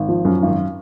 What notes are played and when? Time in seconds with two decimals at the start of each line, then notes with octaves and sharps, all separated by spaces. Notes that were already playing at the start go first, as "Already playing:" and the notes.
Already playing: G#1
0.09 F3
0.25 F#2
0.42 G#1